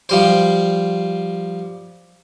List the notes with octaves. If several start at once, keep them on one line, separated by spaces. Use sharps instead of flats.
F3 G3 C5